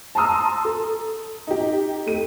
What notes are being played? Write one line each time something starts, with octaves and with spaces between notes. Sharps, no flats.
A5 A#5 C6 D#6 E6
A4
D#4 G4
A3 D#7